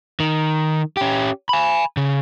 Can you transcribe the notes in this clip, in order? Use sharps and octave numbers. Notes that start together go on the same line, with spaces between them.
D#3
C#4 G4
G#5 B5
C#3